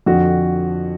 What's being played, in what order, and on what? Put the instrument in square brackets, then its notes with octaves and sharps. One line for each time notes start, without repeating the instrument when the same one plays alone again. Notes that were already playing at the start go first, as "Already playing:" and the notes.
[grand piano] F2 D3 F3 F#4